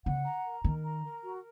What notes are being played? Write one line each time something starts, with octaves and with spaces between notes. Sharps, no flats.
C#3 F#5
A#5
A#4
D#3 A#4
A#5
A#4
F#4